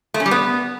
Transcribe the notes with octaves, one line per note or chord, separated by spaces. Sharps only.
A3
C#4
G3
B3